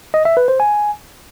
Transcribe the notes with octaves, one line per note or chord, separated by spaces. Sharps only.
D#5
E5
B4
C5
G#5